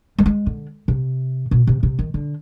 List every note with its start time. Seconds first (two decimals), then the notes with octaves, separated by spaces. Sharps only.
0.18 G3
0.26 G#3
0.47 D3
0.88 C3
1.51 B2
1.67 C3
1.83 C3
1.99 D#3
2.14 D3